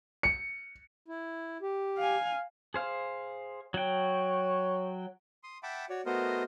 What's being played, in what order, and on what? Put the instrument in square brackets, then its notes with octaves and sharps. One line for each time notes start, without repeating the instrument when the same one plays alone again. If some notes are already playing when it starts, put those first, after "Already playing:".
[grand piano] C#7
[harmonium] E4
G4
[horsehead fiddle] F5 G#5
[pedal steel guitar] G#4 C5 F5
[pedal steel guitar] F#3 G5 [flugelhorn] C#5
[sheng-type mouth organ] C6 D#6
E5 F#5 G5 A5 B5 D6
F#4 C#5 D5
A3 B3 F#4 A#4 C5 D#5